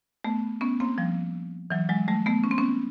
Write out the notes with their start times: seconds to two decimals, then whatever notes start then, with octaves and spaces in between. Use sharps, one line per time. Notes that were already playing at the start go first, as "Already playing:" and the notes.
0.24 A3 B3
0.61 B3 C#4
0.80 A#3 C4
0.98 F3 G3
1.70 E3 F#3
1.89 F#3 G#3
2.08 G3 A3
2.26 A3 B3
2.44 C#4
2.51 C4
2.58 B3 C#4